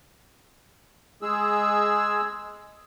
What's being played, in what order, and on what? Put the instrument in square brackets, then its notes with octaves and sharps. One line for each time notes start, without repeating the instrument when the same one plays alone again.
[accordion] G#3 G#4 E6